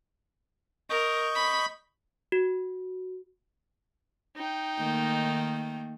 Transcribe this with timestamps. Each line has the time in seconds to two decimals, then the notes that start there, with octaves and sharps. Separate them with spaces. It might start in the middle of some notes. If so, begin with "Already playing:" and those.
0.90 A#4 D#5 C#6 G6
1.35 B5
2.32 F#4
4.36 D#4 G5
4.79 D#3 A3 A#3